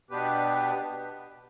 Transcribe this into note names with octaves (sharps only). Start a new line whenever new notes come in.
B2 B3 D4 G4 B4